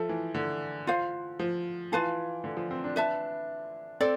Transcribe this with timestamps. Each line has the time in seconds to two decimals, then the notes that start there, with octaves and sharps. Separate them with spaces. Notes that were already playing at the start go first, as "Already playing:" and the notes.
Already playing: F3 A4 E5 A5
0.09 E3
0.35 D3
0.87 F4 C5 F5
1.39 F3
1.92 E3 F4 B4 F5 A5
2.44 D3
2.57 F3
2.71 C4
2.84 D4
2.96 B4 E5 A5
4.01 C4 A4 D5